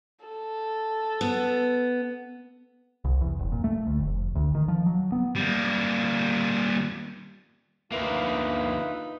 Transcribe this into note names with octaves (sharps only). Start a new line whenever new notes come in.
A4
B3
C2
E2
F1
A#2
A3
D2
F1
D2
D#3
F3
F#3
B3
G3 A#3
D2 A#3 D#4 F4 B4 E5